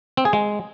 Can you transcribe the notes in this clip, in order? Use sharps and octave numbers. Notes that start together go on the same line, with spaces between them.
C4
G#4
G#3